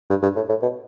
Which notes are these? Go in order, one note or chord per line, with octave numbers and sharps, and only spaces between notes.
G2
G2
A2
A2
B2